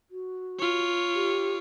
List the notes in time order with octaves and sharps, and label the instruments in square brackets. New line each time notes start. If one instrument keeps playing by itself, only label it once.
[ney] F#4
[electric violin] F4 C#5
[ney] G4